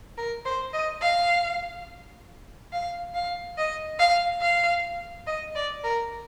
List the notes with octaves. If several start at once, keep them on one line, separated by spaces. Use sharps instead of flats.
A#4
C5
D#5
F5
F5
F5
D#5
F5
F5
D#5
D5
A#4